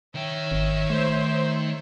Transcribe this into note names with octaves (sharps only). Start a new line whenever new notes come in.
D#3 C#5 E5 G5
G#1
A3 C5